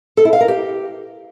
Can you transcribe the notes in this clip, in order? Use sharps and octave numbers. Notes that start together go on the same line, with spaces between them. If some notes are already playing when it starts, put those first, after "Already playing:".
A4
E4
F5
A#4
G4